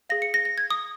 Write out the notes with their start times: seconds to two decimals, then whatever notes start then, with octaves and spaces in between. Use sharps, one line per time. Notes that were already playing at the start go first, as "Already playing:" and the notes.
0.10 G#4 F5 A#6
0.22 C#7
0.34 A#6
0.45 A#6
0.58 G#6
0.71 D#6